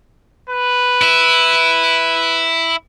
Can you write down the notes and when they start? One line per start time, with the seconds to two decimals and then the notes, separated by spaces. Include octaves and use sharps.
0.49 B4
1.02 E4